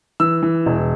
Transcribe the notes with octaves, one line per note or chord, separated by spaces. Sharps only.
E3 E6
E3
E1